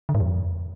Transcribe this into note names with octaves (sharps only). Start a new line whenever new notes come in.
D3
G#2
F2